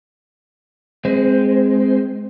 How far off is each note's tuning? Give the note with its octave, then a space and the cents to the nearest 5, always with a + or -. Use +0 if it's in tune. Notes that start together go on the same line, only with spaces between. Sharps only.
G#3 +0 C4 +0 C5 -30